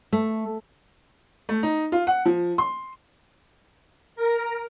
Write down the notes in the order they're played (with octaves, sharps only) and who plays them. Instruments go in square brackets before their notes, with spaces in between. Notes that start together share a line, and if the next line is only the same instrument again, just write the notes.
[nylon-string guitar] A3
[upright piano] A3
D#4
F4
F#5
F3
C6
[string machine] A#4